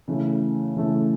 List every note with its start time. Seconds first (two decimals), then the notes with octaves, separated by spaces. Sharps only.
0.08 C#3 E3 A3
0.76 C#3 E3 A3